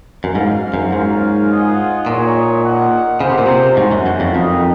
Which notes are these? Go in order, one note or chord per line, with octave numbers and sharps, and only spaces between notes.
F#2
G#2 F#4 C5 F5
F#2
G#2 A#3 C#4 F4 A#4 F5
F4 G#4 D#5 F#5
A#2 A#3 D#4 G#4 C#5
D#4 A#4 D#5 F#5
C#3 A#3 F4 C5
C3
A#2
C3
G#2 A#3 C#4 F#4
F#2
F#2
F2
F2 A#3 D#4 A#4 D#5